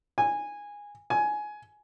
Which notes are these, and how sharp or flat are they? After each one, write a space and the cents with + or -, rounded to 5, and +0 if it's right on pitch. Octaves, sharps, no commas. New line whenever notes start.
G#5 -15
G#5 +15